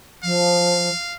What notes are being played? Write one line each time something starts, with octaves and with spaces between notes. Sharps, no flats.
F3 F5